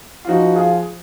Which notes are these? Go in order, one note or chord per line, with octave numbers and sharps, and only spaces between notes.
F4
F3 D#4 F#4
F4 G#4